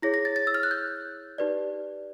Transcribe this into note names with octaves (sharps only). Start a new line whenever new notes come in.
E4 G#4 C#5 A#6
A#6
A6
A6
E6
F6
F#6
G6
D#4 G4 B4 D5